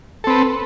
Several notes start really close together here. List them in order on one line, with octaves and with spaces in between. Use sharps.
A4 C4 B4